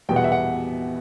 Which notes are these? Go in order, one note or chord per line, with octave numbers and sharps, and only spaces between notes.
E2 B2 G3 B3 G5
F#5
E5
F#5